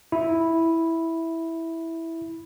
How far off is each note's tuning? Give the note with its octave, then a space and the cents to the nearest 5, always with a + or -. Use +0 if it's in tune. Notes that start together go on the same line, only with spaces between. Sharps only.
E4 -5